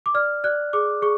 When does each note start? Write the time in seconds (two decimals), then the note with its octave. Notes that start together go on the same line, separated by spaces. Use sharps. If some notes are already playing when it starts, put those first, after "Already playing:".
0.06 D6
0.15 D5 F6
0.44 D5 F#6
0.73 G#4 D6
1.02 G#4 C#6